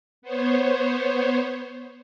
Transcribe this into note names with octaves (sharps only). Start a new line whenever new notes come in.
B3 C5 C#5